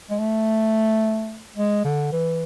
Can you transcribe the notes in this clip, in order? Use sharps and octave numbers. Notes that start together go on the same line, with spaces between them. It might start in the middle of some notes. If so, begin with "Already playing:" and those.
G#3
A3
G#3
D3
E3